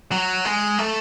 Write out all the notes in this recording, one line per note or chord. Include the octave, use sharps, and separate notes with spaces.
F#3
G#3
A3